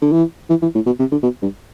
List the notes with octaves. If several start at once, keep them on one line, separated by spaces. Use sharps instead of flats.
D3
E3
E3
E3
A2
B2
C3
D3
B2
G2